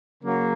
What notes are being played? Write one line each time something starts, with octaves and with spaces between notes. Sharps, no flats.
C#3 F#3 A#3